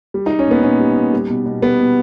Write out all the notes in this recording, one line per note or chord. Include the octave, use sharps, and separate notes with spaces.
G3
D#4
G3
C#4
A#2 B3
A#2 C#4
G3
A#2
G3
B2
B2
G3 B3
B2